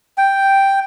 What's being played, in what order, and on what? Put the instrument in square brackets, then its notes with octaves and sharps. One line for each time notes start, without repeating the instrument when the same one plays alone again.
[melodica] G5